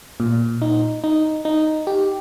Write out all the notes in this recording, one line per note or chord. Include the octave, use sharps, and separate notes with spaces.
A#2
D#4
D#4
D#4
G4